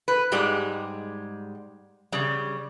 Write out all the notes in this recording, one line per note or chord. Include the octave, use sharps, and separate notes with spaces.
B4
G#2 G3 G#3 G4
C#3 G3